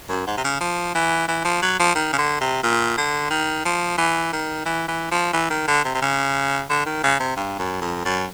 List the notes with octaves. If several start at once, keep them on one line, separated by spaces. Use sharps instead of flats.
F#2
G#2
C3
C#3
F3
E3
E3
F3
F#3
F3
D#3
C#3
D3
C3
A#2
D3
D#3
F3
E3
D#3
E3
E3
F3
E3
D#3
D3
C3
C3
C#3
D3
D#3
C#3
C3
G2
F#2
F2
F#2